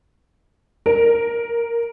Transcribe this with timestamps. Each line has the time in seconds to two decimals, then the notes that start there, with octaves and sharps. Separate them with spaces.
0.86 A#4